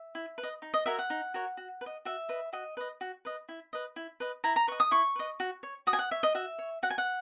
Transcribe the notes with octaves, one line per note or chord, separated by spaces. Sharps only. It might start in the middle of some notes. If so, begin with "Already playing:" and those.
Already playing: E5
E4
B4
D#5
D#4
D#5
F#4 A#4 C#5 E5
F#5
D#4
F#4 A#4 C#5
F#4
B4
D#5
F#4 E5
B4 D#5
F#4 D#5
B4 D#5
F#4
B4 D#5
E4
B4 D#5
E4
B4 D#5
E4 A#5
A#5
B4 D#5 C#6
D#6
E4 C#6
B4 D#5
F#4
C#5
F#4 D#6
G#5
F#5
C#5 E5
D#5
F#4 E5
C#5
F#4 F#5
G#5
F#5